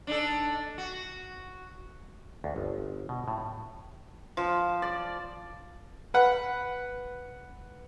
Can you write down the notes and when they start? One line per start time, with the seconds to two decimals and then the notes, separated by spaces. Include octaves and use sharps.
0.07 D4 D#4 A4
0.78 F#4
2.44 D2
2.56 G1
3.09 B2
3.28 A2
4.37 F3
4.82 D5
6.14 B4 F#5